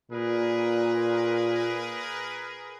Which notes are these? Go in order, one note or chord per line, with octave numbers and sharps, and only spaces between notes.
A#2 G#4 A#4 B4